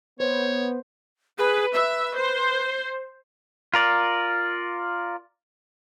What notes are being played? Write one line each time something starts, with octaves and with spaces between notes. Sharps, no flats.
B3 C5 C#5
G#4 B4
B4 E5
C5
F4 A#4 D5